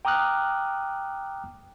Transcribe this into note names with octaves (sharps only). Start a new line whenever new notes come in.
G5 A#5 D6 D#6 F6 F#6